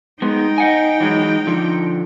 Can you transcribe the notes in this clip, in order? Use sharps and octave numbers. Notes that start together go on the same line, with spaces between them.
G#3 B3 D#4 G5
D#5 F#5 G#5
E3 F#3 G#3
D3 F3